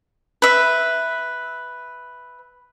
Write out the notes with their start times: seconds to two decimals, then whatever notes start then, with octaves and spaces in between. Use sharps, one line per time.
0.42 B4 E5